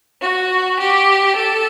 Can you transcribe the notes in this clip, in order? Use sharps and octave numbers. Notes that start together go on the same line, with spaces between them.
F#4
G4
A4